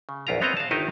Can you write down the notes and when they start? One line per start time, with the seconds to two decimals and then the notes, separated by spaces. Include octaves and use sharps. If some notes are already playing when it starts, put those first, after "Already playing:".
0.09 C#3
0.27 A#1 E2 E4 F4 A#4 A#5
0.42 B3 C4 C#5 D#5 A#5
0.57 F5 A5
0.71 G1 D#3 D#4 E4 D#5